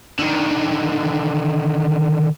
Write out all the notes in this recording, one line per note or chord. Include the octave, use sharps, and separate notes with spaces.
D3 D#3